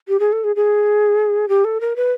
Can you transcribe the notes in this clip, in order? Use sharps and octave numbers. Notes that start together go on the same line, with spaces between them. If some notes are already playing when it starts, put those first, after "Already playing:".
G4
G#4
A4
G#4
G#4
G4
A4
A#4
B4